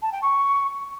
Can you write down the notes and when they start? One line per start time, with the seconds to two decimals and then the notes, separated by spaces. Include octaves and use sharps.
0.02 A5
0.12 G5
0.22 C#6